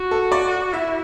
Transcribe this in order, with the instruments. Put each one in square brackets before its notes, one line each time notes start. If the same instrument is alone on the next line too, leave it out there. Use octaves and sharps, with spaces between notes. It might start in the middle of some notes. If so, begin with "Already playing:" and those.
Already playing: [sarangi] F#4
[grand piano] A4
D5
[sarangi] E4 [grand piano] E5